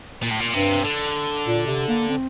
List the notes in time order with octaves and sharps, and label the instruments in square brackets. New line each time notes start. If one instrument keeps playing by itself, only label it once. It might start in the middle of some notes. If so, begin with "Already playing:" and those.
[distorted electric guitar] A#2
A2
A#2
[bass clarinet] G2 [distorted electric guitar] C3
[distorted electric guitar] D3
[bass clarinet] A#2
C3
A#3
C4